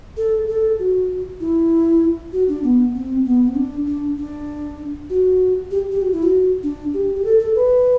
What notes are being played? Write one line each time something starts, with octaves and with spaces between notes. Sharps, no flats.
A4
A4
F#4
E4
F#4
D4
B3
C4
B3
C4
D4
D4
D4
F#4
G4
G4
F#4
E4
F#4
D4
G4
G4
A4
A4
B4